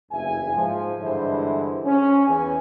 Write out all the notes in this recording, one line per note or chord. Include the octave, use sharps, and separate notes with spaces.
F#1 E2 G2 E5 G#5
G#2 F3
G2 D3 E3 G#3 E4 C5
C#4
E2 E3 G#5